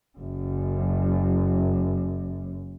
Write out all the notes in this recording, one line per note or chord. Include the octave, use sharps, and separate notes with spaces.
F#1 F#2